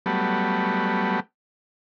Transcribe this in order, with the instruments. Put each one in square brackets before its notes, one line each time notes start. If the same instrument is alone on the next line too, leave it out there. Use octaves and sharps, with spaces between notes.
[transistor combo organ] F#3 G3 A3 B3